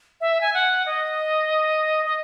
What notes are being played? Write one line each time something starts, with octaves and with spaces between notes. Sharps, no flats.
E5
G#5
F#5
D#5
D#5